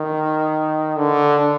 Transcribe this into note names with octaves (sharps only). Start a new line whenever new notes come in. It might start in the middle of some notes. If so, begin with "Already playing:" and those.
Already playing: D#3
D3